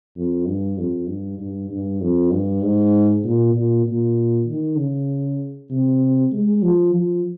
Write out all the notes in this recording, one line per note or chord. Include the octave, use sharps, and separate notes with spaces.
F2
G2
F2
G2
G2
G2
F2
G2
G#2
A#2
A#2
A#2
D#3
C#3
C3
G#3
F3
F3